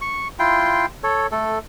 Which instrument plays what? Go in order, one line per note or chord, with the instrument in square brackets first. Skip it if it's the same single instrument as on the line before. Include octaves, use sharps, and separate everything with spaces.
[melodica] C#6
E4 F4 G5 C6
A4 C#5
A3 A4